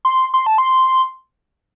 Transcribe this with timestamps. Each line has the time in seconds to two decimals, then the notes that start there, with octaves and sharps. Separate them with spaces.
0.05 C6
0.34 C6
0.46 A5
0.58 C6